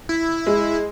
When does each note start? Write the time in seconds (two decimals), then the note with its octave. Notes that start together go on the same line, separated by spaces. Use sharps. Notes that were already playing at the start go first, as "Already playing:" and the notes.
0.09 E4
0.47 G#3